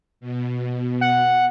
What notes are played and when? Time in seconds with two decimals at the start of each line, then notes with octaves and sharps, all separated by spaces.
0.20 B2
1.01 F#5